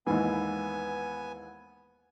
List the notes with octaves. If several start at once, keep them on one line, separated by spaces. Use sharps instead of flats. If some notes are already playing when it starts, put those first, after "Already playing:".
D#2 G#2 E3 B3 G#5